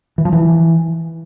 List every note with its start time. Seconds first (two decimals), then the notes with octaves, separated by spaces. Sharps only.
0.18 E3
0.25 F3
0.33 E3